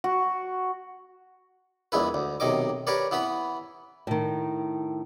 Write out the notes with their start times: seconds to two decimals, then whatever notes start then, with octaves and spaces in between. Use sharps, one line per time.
0.04 F#4
1.92 A#1 E2 G#3 E4 B4
2.14 D2
2.40 B1 C3 D#3 D#5 D6
2.87 G4 A#4 B4 C#5 D5
3.11 E3 B3 B4 B5
4.07 A2 D#3